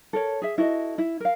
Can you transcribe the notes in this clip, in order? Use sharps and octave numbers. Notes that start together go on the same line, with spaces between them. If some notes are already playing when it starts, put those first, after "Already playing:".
A4 A#4 C#5
G#4 E5
E4 F#4 A4 D#5
E4
A#4 F5